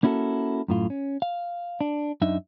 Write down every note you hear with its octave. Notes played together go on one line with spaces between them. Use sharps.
A#3 C#4 E4 F#4 G4 A4
F#2 A2 F4
C#4
F5
D4
F#2 D4 D#4 E5